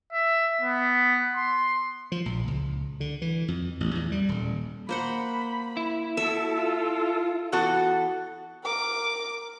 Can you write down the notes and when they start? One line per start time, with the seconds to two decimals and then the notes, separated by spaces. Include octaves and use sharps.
0.13 E5
0.61 B3
1.36 C6
2.12 F3
2.26 A#1
2.48 C#2
3.00 D3
3.22 E3
3.48 F2
3.80 A1
3.95 E2
4.12 G3
4.29 D#1
4.89 A#3 C5 F#5 B5
5.77 E4
6.17 F#4 A4 E5
6.54 F4
7.52 E3 B3 F#4 A4
8.64 A#4 D6